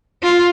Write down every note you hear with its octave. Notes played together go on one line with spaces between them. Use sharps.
F4